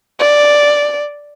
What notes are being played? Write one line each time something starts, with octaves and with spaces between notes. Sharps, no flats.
D5